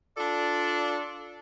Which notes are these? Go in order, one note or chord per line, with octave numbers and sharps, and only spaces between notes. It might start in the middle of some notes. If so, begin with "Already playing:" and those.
D4 F4 A4 D5